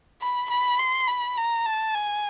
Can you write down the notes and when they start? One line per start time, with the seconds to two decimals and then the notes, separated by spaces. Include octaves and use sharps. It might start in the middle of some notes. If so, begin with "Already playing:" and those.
0.21 B5
0.50 B5
0.79 C6
1.08 B5
1.37 A#5
1.65 A5
1.95 G#5